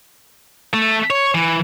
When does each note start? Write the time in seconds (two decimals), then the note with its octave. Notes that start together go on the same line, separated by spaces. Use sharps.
0.73 A3
1.10 C#5
1.35 E3